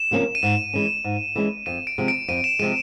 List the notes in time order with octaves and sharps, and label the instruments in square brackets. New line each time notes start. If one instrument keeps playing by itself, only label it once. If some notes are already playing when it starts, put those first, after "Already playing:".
Already playing: [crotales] E7
[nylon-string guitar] C3 F3 A#3 C#4
[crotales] D#7
[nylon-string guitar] G#2 [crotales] E7
[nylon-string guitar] E3 G#3 C#4
G#2
E3 G#3 C#4
[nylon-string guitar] F2 [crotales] D#7
[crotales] D7
[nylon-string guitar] C3 F3 G#3
[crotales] D7
[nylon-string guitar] F2 [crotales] D#7
[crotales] E7
[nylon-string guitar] C3 F3 G#3 [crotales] D#7